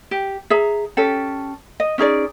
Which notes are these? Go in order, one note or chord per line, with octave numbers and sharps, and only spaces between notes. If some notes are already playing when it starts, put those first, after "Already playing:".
G4
G#4 E5 A#5
C#4 G4 A4
D#5
C#4 D#4 G#4 D5